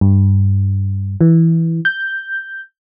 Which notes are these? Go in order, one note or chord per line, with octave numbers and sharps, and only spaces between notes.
G2
E3
G6